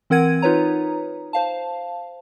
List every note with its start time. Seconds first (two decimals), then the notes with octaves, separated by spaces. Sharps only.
0.10 E3 C4 A#4 F#5 G#6 D#7
0.42 D#4 F4 B4 C#5 A#5
1.33 C5 F5 A5